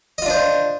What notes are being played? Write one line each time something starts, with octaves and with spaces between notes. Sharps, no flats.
D4 F4 C5 D#5